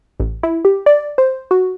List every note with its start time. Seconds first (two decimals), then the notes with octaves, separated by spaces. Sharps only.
0.20 A1
0.43 E4
0.65 G4
0.86 D5
1.18 C5
1.51 F#4